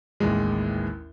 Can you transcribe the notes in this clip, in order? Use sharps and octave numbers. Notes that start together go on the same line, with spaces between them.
A1 D#2 G#3